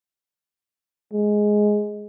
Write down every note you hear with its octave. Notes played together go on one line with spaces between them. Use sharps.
G#3